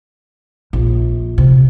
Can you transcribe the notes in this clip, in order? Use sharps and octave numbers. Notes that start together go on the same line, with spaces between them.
A#1
C3